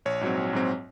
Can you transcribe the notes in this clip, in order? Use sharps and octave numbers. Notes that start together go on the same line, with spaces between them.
A#1 C#5
G#2 F#3 C4
A#1
G#2 F#3 C4